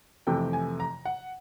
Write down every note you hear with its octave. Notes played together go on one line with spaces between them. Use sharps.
F2 C3 E3 A3 G5
G#5
A#5
F#5